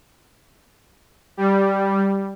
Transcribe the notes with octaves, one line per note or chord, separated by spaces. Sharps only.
G3